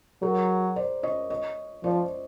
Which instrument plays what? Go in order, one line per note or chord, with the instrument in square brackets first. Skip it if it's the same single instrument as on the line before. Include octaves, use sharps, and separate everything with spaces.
[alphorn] F#3 [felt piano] G#4 A#4
[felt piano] C5 D5
C#5 D#5
C#5 D#5
[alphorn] F3 [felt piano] C5 D5